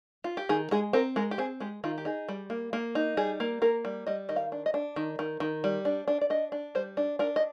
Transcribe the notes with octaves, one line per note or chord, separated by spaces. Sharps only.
F4
G4
D#3 G#4
G#3 G#4
C4 A#4
G#3 A#4
G4
C4 G#4
G#3 G4
D#3 F4
G4
D#4 G#4
G3
A#3
A#3
D#4
G3 G#4
A#3
A#3 A#4
G3
G3 D#5
D#3 D#5
F5
D4
D#5
D4
D#3
D#3
D#3
G3
D4
D4
D5
D4 D#5
D4
G3 C5
D4
D4 A#4
D#5